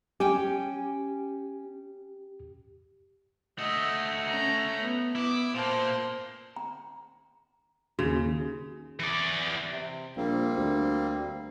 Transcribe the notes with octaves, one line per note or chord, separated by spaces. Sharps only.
C#4 G4 G5 G#5
A3 F#4 D#5 E5
C#4 A#5
B3
B3 E4 D6
A#2 A#3 C5 A5
A#5
D#2 C#3 F#4
E3 D5
C3
A#1 G3 A#3 C4
D2